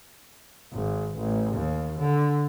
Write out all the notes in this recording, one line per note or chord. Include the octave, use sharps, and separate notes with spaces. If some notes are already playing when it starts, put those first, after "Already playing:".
G#1
A1
D#2
D3